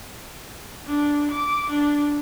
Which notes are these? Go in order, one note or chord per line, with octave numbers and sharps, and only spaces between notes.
D4
D6
D4